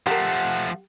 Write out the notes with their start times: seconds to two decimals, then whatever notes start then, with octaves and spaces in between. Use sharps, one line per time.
0.07 F3 A3 G4 A#4 F#5